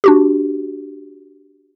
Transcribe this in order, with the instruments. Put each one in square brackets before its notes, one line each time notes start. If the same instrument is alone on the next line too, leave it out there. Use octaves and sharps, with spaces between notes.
[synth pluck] D4 F#4 G4